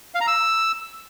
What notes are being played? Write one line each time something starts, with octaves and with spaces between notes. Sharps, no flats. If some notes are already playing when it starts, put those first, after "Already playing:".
F5
A#5
E6